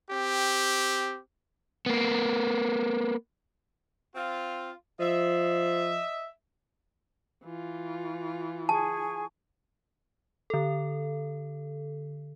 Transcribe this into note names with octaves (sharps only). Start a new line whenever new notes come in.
C4 G4
A#3 B3
C4 F4
F3 D#5 E5
E3 F4
G#4 G#5 A5 C#6
D3 A4